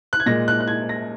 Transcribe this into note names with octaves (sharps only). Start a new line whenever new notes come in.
F#6
G#6
A#2 G#3 A#6
F#6
F#6
G#6
A#6